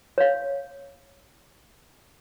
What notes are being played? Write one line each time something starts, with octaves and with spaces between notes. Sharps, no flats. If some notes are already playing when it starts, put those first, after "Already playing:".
C#5 F5